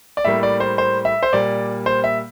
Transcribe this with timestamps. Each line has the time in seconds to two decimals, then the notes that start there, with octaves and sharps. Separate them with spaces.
0.17 D5
0.25 A2 G3 A#3 E5
0.43 D5
0.60 C5
0.78 C5
1.05 E5
1.23 C5
1.33 A#2 G3 A#3 D5
1.86 C5
2.04 E5